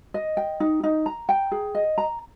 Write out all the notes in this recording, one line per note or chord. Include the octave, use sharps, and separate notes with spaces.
D#5
G5
D#4
D#4
A#5
G5
G#4
D#5
A#5